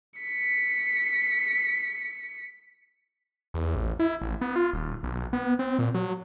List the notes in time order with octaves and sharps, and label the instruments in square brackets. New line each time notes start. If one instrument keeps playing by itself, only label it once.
[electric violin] B6 C#7
[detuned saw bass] E2
A1
E4
A1
B3
F4
D#1
B1
B3
C4
A#2
F#3